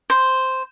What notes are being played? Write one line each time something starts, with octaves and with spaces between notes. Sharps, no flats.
C5